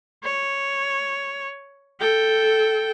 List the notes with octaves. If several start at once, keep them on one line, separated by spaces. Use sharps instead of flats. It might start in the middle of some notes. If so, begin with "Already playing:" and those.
C#5
A4 G5